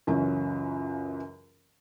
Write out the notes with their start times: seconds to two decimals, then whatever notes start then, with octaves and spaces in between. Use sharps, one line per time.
0.07 C#2 F#2 E3 F#3 C#4